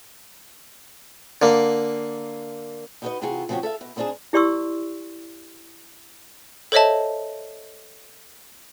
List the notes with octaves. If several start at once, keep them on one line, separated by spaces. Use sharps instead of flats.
D3 A#3
D#4 E4 F#4 A4 B4 D#5
C3 E3 F4 F#4 G#4
C#3 F3 C4 F#4 G4 C#5
A4 E5 F5
B2
C#3 B3 C4 D4 D#4 G#4
E4 G4 D5 C6 C#6 E6
A4 C5 C#5 D#5 E5 A5